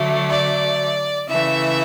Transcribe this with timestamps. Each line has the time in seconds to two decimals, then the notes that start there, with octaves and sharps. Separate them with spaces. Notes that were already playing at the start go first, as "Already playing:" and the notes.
Already playing: D3 F#3 A3
0.30 D5
1.28 C#3 E3 A3 E5